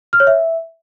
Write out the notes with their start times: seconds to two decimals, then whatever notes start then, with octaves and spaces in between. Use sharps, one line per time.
0.13 F6
0.20 C#5
0.27 E5